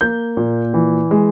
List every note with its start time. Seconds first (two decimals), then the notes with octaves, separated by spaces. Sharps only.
0.01 A#3 G6
0.37 A#2
0.74 E3
1.11 G#3